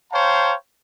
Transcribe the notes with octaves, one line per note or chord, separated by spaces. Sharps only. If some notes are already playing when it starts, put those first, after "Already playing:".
C5 C#5 F5 G5 A5 A#5